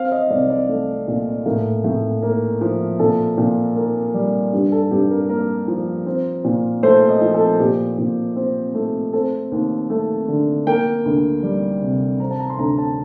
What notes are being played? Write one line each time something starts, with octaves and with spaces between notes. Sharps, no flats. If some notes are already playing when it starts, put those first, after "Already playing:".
Already playing: C4 F5
D#5
C2 D5
D5
A3
A#2
A2 A#4
A2
A#3
F3
A#2 A4
A#2
A#3
G3
G2 G4
A4
G2 G4
A#4
A#3 A#4
F3
C4
A#2
A3 C5
D#5
F3
A4
A#2 G4
A#2
C4
A3
C4 A4
D#2
A3
D3
A#3 G5
D2
G3
C3
C4 A#5
A5
A#5
C6
D2 A#5
A5